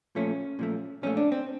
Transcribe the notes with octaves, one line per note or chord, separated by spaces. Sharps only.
A#2 F3 A3 C#4
A#2 F3 A3
A#2 F3 A3 C#4
D4
C4